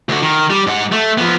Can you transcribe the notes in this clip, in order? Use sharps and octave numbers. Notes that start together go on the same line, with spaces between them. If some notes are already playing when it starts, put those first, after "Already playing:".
D2 F#4
D#3
G3
G#2 F#5
A3
F3 B3